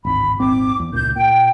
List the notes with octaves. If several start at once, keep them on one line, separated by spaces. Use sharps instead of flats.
D1 G#1 B5
D#1 G#1 C4 D6
E2
C#2 A#2 G6
A#2 G5